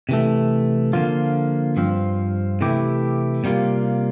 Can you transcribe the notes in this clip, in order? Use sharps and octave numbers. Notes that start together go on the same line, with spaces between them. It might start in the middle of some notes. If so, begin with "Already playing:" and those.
C3 E3 A3
D3 F3 A#3 F4
G2 F3 C4 F4
C3 E3 A3 E4 G4
C3 G3 A#3 F4